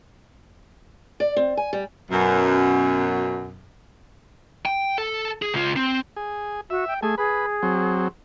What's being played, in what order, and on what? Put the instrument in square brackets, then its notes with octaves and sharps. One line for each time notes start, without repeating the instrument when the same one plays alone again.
[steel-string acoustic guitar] D5
C4
G#5
G3
[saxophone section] F#2 B2
[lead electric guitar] G5
A4
G#4
C#2 F4
C4
[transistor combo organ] G#4
[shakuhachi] F#4 [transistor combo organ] E5
[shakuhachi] G5
[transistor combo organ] A3 G#5 [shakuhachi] G#4
[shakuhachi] G#4 [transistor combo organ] B4
[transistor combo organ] F#3 C4